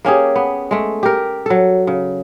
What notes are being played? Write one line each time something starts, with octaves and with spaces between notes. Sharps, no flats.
A#3 C#4 G4 G#4
B3
G#3 A3
G4 A#4
F#3 A4
C#3